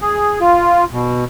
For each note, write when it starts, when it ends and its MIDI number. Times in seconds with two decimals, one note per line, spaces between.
0.01 0.39 68
0.41 0.84 65
0.93 1.24 47